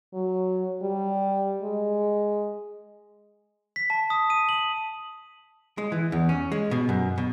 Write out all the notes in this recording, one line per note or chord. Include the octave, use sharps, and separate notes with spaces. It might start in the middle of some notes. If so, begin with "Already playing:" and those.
F#3
G3
G#3
B6
A5
D#6
D#7
F#7
G#3
E3
E2
C#4
G#3
B2
F#2
B2